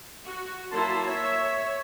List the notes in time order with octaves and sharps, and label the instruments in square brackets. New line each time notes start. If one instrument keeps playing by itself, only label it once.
[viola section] F#4
[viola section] F#3 A#3 E4 [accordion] A5 C6
[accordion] C#5 [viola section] E5